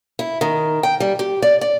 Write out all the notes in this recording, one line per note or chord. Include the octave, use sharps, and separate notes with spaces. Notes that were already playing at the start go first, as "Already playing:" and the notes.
E4
D#3
G5
G3
G4
D5
D5